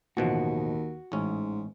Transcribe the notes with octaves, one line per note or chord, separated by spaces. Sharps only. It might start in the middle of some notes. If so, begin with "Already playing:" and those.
A1 D#2 B2 F3 F#4
A1 G#2 C#4